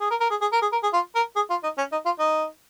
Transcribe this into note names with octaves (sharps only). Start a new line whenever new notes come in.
G#4
A#4
A#4
G#4
G#4
A#4
G#4
A#4
G#4
F4
A#4
G#4
F4
D#4
C#4
D#4
F4
D#4